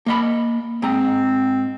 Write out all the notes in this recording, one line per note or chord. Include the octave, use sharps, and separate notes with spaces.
A#3 D#5 B5
G#2 C4 A#5